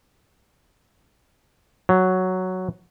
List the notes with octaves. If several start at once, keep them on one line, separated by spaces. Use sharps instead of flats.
F#3